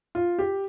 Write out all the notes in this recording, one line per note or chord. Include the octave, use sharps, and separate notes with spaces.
F4
G4